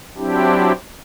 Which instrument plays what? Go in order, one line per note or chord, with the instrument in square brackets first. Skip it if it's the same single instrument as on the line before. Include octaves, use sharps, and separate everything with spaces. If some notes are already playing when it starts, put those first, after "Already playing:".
[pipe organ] F#3 C4 D4 E4 G4